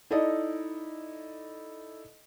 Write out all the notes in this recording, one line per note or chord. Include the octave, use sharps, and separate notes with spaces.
D#4 E4 A4 D5 D#5